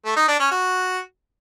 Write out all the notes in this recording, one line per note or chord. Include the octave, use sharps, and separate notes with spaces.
A3
D#4
D4
C#4
F#4